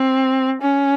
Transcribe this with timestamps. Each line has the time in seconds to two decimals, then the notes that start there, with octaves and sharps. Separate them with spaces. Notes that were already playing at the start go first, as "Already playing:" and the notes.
Already playing: C4
0.62 C#4